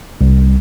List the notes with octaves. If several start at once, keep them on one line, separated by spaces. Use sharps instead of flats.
C2